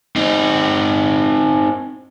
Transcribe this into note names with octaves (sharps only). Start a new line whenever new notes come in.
C4 D#4